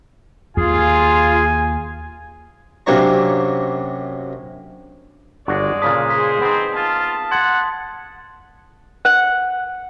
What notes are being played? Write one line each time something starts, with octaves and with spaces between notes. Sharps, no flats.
D#2 F4 G#4 G#5
F#2 C3 A#3 D4 C#5 A#5
G1 G#3 D4 F#4 D5
A#2 C#3 A5 D#6 B6
G#4 C5 B6
B3 C4 D#4
F4 A5
F#5 C6 G#6 A6
F#5